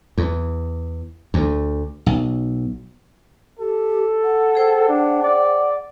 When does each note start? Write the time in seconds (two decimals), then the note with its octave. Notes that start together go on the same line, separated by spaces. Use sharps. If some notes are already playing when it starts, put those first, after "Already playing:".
0.18 E2
1.34 D2
2.06 B1
3.59 G4 A4
4.24 F#5
4.55 G#4 C5 G5
4.88 D4
5.23 D5